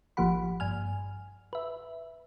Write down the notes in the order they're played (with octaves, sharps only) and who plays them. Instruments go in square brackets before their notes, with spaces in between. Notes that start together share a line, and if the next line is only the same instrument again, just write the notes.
[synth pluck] G#1 F3 A#3 G4 F#5 B5
G2 G#5 F6
B4 E5